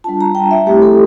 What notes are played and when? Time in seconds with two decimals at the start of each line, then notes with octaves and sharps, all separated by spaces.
0.04 G3 D4 F4 A5
0.21 A#5
0.35 G5
0.51 E5
0.66 A3 C4 E4 G4
0.82 A4